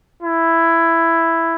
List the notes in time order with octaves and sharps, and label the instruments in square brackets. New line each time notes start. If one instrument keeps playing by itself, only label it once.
[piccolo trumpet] E4